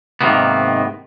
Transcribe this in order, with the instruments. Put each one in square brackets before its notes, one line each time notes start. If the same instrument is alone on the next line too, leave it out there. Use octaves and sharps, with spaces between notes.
[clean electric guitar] G#2 C3 D#3 A#3 B3